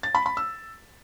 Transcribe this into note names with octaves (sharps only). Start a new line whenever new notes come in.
A6
B5
B5
E6